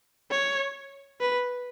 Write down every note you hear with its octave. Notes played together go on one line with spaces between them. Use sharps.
C#5
B4